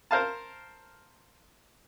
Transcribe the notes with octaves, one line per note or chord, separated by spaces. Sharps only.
A#4 C5 F5 A5